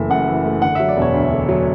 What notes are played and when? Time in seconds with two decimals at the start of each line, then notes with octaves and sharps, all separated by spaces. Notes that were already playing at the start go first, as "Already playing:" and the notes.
Already playing: F#1 E3 A3 E5
0.10 F#2 F#5
0.28 E3
0.45 A3
0.62 D3 F#5
0.75 F#3 E5
0.89 D5
0.97 E1
1.02 C#5
1.14 D2
1.31 D3
1.49 F#3